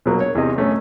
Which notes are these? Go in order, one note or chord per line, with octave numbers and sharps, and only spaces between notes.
B2 F#3 A#3
C#5
E2 C3 D#5
F#2 A3 C#4